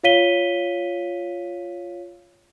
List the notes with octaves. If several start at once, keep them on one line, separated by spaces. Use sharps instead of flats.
F4 C#5 F5 B6 D#7 G7